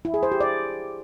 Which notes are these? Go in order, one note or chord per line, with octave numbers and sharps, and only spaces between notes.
E4
G#4
C5
G4
D5